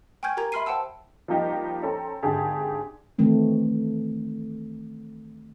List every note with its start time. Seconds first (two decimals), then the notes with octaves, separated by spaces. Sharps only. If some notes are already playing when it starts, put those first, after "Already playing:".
0.23 G5 G#5 C#6 F6 G6 G#6
0.37 G4 A#4 A#5 G#6
0.52 E5 B5 C6 F6 C7 D#7
0.66 C5 F#5 G5 A5 E6
1.28 F3 G3 A#3 D#4 G4
1.83 C#4 A4 C5 G5 A#5
2.23 G#1 D3 G4 G#4 A5
3.19 D#3 E3 A3 C4